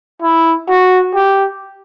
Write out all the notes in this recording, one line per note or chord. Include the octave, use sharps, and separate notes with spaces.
E4
F#4
G4